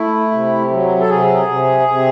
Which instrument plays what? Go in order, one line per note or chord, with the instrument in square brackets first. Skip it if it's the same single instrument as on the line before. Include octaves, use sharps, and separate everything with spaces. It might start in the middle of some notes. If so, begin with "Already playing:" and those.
Already playing: [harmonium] A3 E4
C3
F#3
A4
C3 G#4
C3
C3